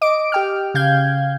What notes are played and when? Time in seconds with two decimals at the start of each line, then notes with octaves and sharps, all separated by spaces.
0.01 D#5 D6 D7
0.32 G4 G5 F6
0.74 C#3 F5 G6 G#6